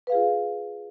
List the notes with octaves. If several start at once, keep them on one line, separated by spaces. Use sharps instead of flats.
F4 G#4 B4 F5